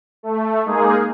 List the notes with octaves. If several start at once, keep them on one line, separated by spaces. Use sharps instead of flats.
A3
G#3 A#3 D#4 G#4